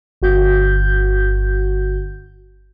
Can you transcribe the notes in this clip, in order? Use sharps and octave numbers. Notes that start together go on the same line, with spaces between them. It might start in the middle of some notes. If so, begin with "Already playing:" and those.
G1 F#4 G6